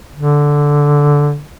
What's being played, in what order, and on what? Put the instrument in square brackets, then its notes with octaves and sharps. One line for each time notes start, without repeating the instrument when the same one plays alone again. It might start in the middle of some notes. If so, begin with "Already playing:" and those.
[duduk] D3